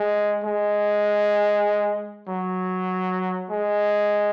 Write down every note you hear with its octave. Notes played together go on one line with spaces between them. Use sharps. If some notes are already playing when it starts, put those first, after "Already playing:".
Already playing: G#3
G#3
F#3
G#3